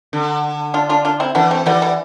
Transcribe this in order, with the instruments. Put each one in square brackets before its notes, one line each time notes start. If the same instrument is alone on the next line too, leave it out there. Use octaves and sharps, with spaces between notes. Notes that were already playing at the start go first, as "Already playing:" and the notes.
[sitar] D3
[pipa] D4 F4
D4 F4
D4 F4
C4 E4
[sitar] E3 [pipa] B3 D4
[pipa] A3 C4
[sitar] E3 [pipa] G3 B3
[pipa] G3 B3